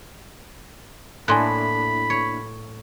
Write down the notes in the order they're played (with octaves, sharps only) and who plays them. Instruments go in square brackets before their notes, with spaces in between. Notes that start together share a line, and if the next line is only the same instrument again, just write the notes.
[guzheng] A2 [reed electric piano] A#3 D4 E4 [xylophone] G#5 C6 F#6 [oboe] B5
[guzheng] C#5